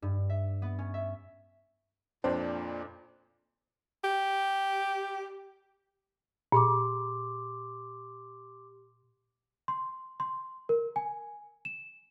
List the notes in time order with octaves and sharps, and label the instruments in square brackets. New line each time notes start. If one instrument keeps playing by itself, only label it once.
[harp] G2
E5
B3
C#4
E5
[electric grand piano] F2 D4 [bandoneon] A#2 [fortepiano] C4
[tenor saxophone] G4
[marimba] A#2 [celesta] G4 C6 D6
[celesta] C6
C6
A#4
G#5
E7